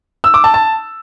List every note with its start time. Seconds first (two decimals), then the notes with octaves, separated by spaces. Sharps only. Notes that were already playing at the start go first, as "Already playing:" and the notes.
0.24 E6
0.34 D6
0.44 A5
0.54 A5